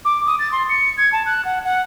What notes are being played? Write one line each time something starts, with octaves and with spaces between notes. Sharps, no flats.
D6
D#6
A6
C6
C#7
G#6
A5
F#6
F#5
F#5